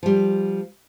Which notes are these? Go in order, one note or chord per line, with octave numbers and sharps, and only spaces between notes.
F3 G3